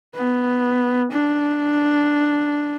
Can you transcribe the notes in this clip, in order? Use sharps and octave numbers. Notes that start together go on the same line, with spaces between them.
B3
D4